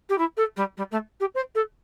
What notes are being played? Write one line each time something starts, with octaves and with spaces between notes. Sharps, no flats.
G4
E4
A4
G3
G3
A3
G4
C5
A4